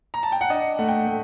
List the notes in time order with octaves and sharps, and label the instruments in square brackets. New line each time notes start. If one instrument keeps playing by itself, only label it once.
[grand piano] A#5
A5
G5
F#5
D4 D#5
A3 F#5
G5
A3